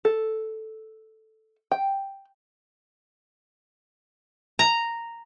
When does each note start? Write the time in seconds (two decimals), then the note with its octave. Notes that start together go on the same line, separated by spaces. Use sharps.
0.05 A4
1.71 G5
4.59 A#5